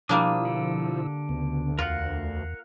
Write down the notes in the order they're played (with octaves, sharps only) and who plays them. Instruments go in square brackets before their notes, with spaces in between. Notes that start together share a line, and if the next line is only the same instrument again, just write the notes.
[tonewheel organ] B2 E4 E6 [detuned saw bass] F3 [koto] G3 A#3 D4 [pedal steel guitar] D#6
[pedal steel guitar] D3
[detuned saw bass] D2 [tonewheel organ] C#3 B3
[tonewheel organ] E2 [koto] F4 [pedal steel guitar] A#4 F5 F#5